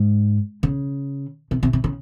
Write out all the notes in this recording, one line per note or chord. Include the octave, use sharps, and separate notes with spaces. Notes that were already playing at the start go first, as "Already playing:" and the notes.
Already playing: G#2
C#3
C3
C3
C3
C#3